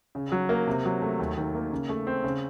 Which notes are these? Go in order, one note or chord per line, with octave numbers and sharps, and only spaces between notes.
C#3
F#3
A#3
C3
F#3
A3
D#2
D#3
A#3
C#3
A3
C4
C#3